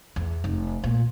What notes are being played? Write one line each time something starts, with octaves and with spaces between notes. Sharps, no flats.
E2
F1
A#2